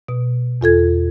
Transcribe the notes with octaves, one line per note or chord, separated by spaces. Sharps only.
B2
E2 F4 A4 G#6